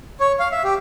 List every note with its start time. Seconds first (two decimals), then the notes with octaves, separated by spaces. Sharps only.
0.20 C#5
0.40 F5
0.52 E5
0.64 G4